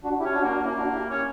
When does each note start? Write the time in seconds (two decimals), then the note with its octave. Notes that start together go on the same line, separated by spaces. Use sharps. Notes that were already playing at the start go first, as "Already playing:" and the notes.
0.04 D4 F#4
0.19 E4 G4
0.25 C#4
0.34 D4 F#4
0.44 A#3
0.49 D4 F#4
0.63 A#3 C#4 E4
0.78 D4 F#4
0.93 E4 G4
1.10 C#4